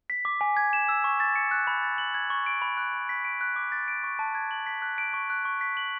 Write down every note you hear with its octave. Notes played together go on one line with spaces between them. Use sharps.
B6
D6
G#5
G#6
E7
E6
C#6
A6
C#7
F#6
B5
A6
F#7
G#6
C#6
D7
B5
F#6
B5
B6
D7
F#6
D6
A6
D7
C#6
A5
G#6
F#7
B6
F#6
D7
C#6
F#6
C#6
B6
F#7